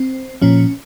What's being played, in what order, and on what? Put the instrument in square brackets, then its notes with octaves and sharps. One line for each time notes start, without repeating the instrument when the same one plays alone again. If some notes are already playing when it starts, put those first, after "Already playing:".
Already playing: [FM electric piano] C4
A#2 F3 C#4